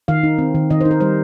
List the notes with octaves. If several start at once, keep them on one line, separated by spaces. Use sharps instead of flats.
D#3 F5
D#4
C4
D#3
D#3 D#5
D#4 C5
A#4
G3 C5